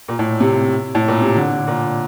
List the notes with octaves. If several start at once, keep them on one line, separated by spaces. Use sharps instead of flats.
A#2
A2
C3
A2
A#2
C3
D3
A#2